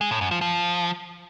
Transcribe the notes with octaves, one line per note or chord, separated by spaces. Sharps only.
G#3
A2
F#2
F3
F3